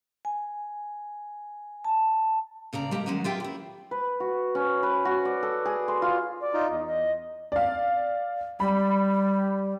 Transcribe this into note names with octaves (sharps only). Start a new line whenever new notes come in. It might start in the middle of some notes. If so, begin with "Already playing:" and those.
G#5
A5
D2 C#3 D5 A#5
G#3 A#3 G4 A#5
D#3 F#3 G#3 C#4 F#4
F4 G4 E5 G5
F#3 E4
B4
F#4
C#4
B4
F#4
D5
A4
G#4
C6
F4
D5
D#4 F4
E2 D#5
D#5
D5 F5
G3 B5